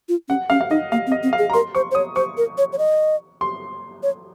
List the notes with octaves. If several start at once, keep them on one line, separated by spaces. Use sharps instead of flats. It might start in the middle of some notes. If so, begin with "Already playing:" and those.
F4
C#4 F#5
C#4 F5
F5
D#4 D#5
A#3 F5
C4
D#5
C4
F5
G#4
A#5
A#4 C6
C5 C#6
C5
C#5 D#6
C5 C#6
A#4
C#5
C#5
D#5
C6
C#5